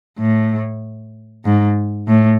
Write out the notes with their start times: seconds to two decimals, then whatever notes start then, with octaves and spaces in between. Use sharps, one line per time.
0.18 A2
1.45 G#2
2.08 A2